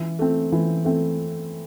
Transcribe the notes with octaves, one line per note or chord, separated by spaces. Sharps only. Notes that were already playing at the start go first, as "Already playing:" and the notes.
Already playing: E3
A3 C4
E3
A3 C4